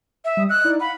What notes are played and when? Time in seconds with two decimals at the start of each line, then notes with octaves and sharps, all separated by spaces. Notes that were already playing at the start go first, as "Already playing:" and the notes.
0.25 E5
0.37 G3 D#6
0.50 D#5 E6 F#6
0.64 D#4 E4 D5
0.80 F5 F#5 B5